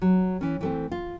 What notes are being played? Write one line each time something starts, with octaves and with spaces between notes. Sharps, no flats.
F#3
E3 C#4
E3 A3 C4
F4